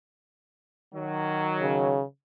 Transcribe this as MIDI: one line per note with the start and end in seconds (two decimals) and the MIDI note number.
0.95 2.02 51
0.95 2.02 54
1.61 2.04 49